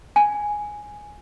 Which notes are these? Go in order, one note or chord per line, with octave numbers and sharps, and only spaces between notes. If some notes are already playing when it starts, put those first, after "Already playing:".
G#5